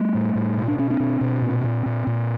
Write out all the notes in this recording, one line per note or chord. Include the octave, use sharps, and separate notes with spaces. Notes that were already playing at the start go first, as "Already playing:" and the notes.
Already playing: G3 A3
A2
A2
B2
D4
B2 C#4
C4 D4
B2
B2
A#2
A#2
A#2
A#2